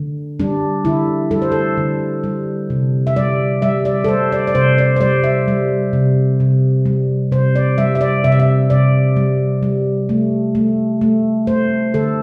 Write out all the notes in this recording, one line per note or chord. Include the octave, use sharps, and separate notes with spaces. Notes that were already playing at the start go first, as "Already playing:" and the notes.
Already playing: D3
G3 D4
D3 E4
G3 A4
C5
A4
D3
G3
C3
E5
G3 D5
G3 E5
D5
A4
G3 C5
D5
D5
C3 C5
D5
C5
G3 D5
E5
G3
C3
C3
G3
C3 C5
D5
G3 E5
E5
D5
C3 E5
D5
E5
C3 D5
G3
G3
A3
A3
A3
A3 C5
D3 A4